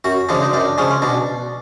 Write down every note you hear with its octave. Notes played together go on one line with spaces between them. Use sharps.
F#2 F#4
C#3 F3 G#3 D4
D#4
F#2 D4
C#3 F3 G#3 C#4
C#4
B2 D4